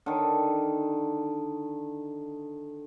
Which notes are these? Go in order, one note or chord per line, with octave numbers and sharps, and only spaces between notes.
D3 D#3